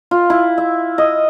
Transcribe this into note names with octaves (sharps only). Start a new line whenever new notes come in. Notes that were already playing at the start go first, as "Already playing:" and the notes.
F4
E4
E5
D#5